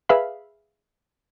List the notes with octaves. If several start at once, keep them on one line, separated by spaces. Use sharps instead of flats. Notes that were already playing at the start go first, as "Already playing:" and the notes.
G#4 B4 E5 F5 B5